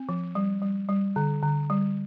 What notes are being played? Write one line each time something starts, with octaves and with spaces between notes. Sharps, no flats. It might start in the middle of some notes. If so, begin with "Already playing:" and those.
Already playing: C4
F3
G3
G3
G3
D3
D3
G3